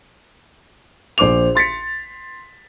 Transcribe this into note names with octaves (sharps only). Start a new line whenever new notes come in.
A#1 C5 D6 F7
C6 A6 B6 C#7